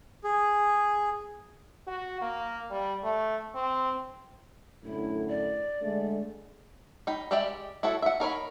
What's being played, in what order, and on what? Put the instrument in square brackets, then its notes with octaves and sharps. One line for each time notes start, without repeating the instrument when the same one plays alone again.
[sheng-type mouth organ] G#4
[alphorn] F#4
A#3
G3
A3
C4
[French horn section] F#2 A2 D3 [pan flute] E4
[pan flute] D5
[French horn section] D3 G#3 A3
[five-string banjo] D#4 G5 B5
G#3 G4 D5 E5 G5
E4 F#4 A4 C#5
E5 F#5
D#4 A#4 C#5 B5